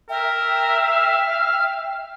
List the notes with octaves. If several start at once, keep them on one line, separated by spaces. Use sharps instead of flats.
A#4 E5 G5
F5